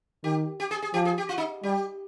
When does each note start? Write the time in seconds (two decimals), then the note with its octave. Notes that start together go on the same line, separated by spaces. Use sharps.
0.24 D#3 G4
0.60 G4
0.71 G#4
0.82 G#4
0.94 F3 G4
1.05 G#4
1.18 G4
1.29 F4
1.38 D#4
1.63 G3 G4